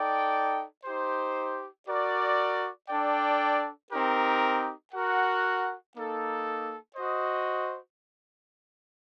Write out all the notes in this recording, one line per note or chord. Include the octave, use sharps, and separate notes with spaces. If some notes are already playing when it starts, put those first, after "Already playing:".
Already playing: D#4 A4 D5 G5
D#4 G4 C5
F#4 A#4 D5
D4 A4 D5 G5
C4 D#4 G4 A#4
F#4 A#4 F#5
A#3 D#4 A4
F#4 C5 D#5